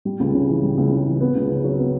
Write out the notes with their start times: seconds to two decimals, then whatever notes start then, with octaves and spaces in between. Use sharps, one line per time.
0.05 G3
0.20 C#2
0.34 C#3
0.49 E3
0.63 G3
0.78 C#2
0.92 C#3
1.06 E3
1.21 B3
1.35 C#2
1.50 C#3
1.64 F#3
1.79 B3